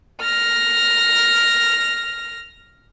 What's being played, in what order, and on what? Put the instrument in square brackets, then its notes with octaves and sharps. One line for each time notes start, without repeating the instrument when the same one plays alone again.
[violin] F6 A#6